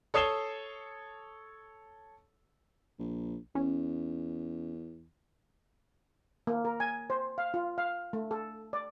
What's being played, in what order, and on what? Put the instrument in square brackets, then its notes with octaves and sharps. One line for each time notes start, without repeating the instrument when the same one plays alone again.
[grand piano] A4 C#5 D#6 C7 E7 G7
[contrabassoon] A#1
[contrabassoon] E2 [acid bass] C#4
[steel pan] A#3
A#4
G#5
C5
F5
F4
F5
A3
A4
D5